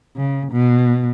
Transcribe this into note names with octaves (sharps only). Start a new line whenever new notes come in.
C#3
B2